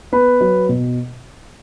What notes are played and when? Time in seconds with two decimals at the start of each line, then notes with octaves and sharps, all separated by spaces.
0.12 B3 B4
0.41 F#3
0.69 B2